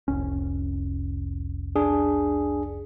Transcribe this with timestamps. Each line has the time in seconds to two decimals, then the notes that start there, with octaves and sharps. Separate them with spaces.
0.08 F1 C2 C#4
1.76 D4 G#4